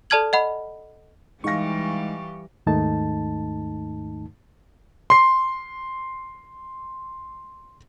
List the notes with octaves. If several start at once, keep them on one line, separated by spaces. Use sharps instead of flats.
A4 D5 A5 F6 G#6 F#7
D#5 F#5 B5
E3 G3 G#3 D#4 G4 F5 C#6 A#6
D#2 G#2 D#3 A3 D#4 A5
C6 C7